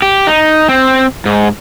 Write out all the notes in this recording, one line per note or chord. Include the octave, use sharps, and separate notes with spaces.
G4
D#4
C4
G#2